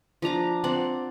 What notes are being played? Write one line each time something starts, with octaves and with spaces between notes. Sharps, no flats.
F3 D4 A#5 D6
C4 D5 F#5